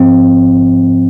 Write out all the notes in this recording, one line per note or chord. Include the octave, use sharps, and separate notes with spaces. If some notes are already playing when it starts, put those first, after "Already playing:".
Already playing: A1 G#2 F3 C4